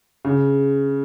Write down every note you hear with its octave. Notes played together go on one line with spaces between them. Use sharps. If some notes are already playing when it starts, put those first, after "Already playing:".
C#3